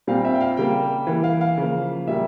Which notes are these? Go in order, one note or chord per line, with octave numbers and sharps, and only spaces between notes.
A#2 G3 C4 F5
E5
G5
F5
C#3 G3 A#3 G5
E3 A#3
F5
F5
C#3 F3 A#3
A#2 G3 A#3 E5